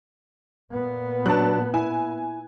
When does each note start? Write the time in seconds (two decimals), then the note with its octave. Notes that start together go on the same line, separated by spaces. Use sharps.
0.73 A#2 B3
1.26 F#3 D4 A5 F#6
1.74 E4 G#5